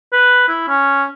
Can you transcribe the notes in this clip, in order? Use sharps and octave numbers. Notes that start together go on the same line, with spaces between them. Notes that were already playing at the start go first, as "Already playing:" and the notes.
B4
E4
C#4